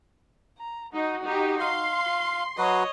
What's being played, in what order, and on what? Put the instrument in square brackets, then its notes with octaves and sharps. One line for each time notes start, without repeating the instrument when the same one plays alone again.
[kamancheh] A#5
[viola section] D#4 [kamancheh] F#4
[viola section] D#4 G4
[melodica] F5 [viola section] C6
[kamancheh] F4
[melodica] F#3 F#4 B4 [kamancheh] C#5 D#5